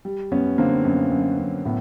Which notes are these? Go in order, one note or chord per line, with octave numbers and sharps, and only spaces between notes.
G3
F#2 B3 C#4
D3 A#3 C4
F#2 B3
F#2
F#2
A2 B3